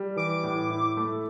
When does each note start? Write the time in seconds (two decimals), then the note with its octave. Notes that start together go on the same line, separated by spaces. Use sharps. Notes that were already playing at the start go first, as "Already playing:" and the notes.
Already playing: G3
0.16 E3 D6
0.44 A2
0.70 E4
0.97 A3